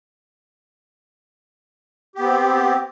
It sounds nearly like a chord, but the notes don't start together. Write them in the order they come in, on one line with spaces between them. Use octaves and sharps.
G4 B3 C4